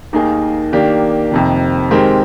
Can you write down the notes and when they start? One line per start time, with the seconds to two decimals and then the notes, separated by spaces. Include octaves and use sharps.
0.13 D#2 D#3 A#3 D#4 G#4
0.73 D#3 A#3 D4 G4
1.31 F2 C3 D#3
1.91 D#3 G#3 C4 G4 A#4